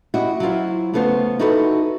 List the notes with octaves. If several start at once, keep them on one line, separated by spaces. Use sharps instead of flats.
E4 F#4 G4 D#5
F#3 E4 F4 C5
C#3 A3 B3 F4 C5
D#4 E4 F#4 A4 B4